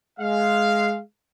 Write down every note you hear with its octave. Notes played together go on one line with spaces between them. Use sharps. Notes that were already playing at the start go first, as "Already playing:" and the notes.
G#3 F5